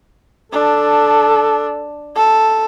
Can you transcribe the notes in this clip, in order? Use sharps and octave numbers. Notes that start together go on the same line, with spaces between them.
D4 A4
A4